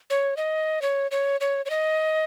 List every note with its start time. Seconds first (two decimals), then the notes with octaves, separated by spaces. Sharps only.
0.10 C#5
0.37 D#5
0.82 C#5
1.11 C#5
1.41 C#5
1.66 C#5
1.70 D#5